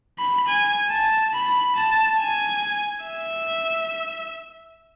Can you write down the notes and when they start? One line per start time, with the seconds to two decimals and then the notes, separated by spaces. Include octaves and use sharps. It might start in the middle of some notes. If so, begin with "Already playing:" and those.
0.19 B5
0.48 G#5
0.90 A5
1.34 B5
1.76 A5
2.19 G#5
3.05 E5